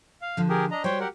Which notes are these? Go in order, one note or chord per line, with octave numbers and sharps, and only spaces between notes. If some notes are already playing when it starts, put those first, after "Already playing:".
F5
D3 F3
G4 G#4 A#4
D4 D#5 A#5
G3 F#4 C5 C#5 G5
G4 A#4 F#5